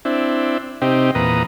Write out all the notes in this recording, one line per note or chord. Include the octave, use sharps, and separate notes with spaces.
C4 D4 E4
C3 C4 D#4 G4
E2 A#2 B4 A#5 D#6